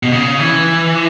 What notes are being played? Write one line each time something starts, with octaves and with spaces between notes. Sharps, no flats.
B2
C#3
E3